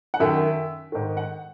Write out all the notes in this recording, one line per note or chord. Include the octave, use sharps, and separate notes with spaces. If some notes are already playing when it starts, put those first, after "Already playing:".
F#5
F#2 D#3 E5
G#2 D#3
F#5